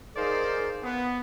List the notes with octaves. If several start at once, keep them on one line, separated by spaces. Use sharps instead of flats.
D#4 G#4 A#4 C5 D5 F5
B3